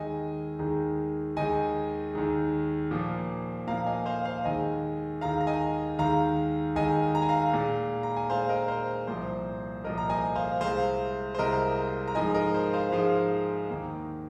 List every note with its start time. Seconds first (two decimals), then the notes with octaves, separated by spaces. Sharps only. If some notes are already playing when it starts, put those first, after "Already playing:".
Already playing: D#2 D#3 G#3 D#5 G#5
0.59 D#2 D#3 G#3
1.36 D#2 D#3 G#3 D#5 G#5
2.13 D#2 D#3 G#3
2.91 A#2 F3 A#3
3.67 A#2 F3 A#3 F5 A#5
3.86 D#5 G#5
4.06 C5 F5
4.25 C5 F5
4.44 D#2 D#3 G#3 D#5 G#5
5.21 D#2 D#3 G#3 F5 A#5
5.41 A#5
5.47 D#5 G#5
5.99 D#2 D#3 G#3 F5 A#5
6.76 D#2 D#3 G#3 D#5 G#5
7.15 A#5
7.22 G#5
7.29 F5 A#5
7.53 A#2 G#3
8.03 A#5
8.17 G#5
8.30 A#2 G#3 C5 F5
8.49 A#4 D#5
8.68 C5
9.07 C2 A#2 F3 C5
9.84 C2 A#2 F3 A#4 D#5
9.98 A#5
10.10 D#5 G#5
10.36 C5 F5
10.61 C2 C3 G#3 C5 F5
11.35 C5
11.39 C2 C3 G#3 A#4 D#5
12.08 A#5
12.15 G#2 F3 G#3 D#5 G#5
12.34 A#4 D#5
12.54 C5
12.74 C5 F5
12.92 G#2 F3 G#3 C5 F5
13.70 D#2 D#3 A#3